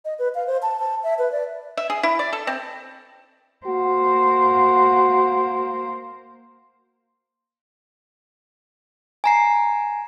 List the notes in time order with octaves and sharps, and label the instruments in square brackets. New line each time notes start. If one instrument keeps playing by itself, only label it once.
[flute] D#5
B4
F5
C5
A5
A5
E5
B4
D5
[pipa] E5
G#4
E4
D5
A4
C4
[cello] A#3 C5 [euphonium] F#4
[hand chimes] G#5 A#5 C7